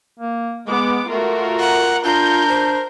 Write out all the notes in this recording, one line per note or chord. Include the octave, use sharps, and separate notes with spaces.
A#3
G#3 B3 D6
A3 F4 F#4 A#4
F#5 A#5
D4 F4 A#4 G6
C5